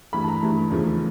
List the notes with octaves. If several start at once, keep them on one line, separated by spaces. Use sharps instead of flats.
G2 E3 A3 B5
A5
A#5
G2 E3 A3
E1 D#2 C#3 F3 A3